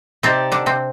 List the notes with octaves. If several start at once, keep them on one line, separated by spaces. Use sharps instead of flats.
C3 C4 D#4 G4 D5 A5
D3 D4
C3 C4